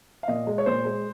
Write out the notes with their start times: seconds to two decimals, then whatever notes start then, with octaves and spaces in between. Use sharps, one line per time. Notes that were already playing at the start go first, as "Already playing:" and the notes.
0.23 F5
0.28 A#2 D#5
0.47 G#3
0.58 C#5
0.66 A#2 C5
0.85 G#3